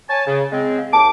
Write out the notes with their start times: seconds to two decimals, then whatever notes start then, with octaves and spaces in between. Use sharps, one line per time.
0.09 C#5 G#5 A5
0.27 C#3
0.52 G#3 C4
0.79 F5
0.93 D#2 A5 D6